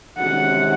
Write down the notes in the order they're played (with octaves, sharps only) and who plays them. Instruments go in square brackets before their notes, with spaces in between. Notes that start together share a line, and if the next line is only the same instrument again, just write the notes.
[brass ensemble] C3 D#3 G#3 C#4 F#4 [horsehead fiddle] F#5